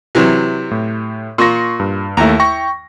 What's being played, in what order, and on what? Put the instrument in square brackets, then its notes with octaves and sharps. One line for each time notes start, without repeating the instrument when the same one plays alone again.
[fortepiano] C3 E3 F#3
[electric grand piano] A2
[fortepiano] A#2 [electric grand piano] C6 C#6 A#6
[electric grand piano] G2
[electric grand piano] D#2 A3 [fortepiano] E4 A#5
[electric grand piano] G5 C#6 A#6